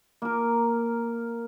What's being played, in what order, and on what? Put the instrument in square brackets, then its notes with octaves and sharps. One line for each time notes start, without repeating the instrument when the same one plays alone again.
[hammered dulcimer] A#3 A#4